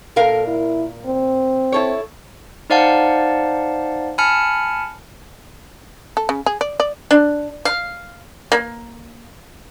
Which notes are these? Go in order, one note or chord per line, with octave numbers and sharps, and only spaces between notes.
A#2 A4 A#4 F5
E4
C4
E4 A4 C#5
D#4 C5 D5 F5 F#5 A5
G#5 A5 B5 F6 C#7
A4
C#3
G#4
D5
D5
D4
F5
A#3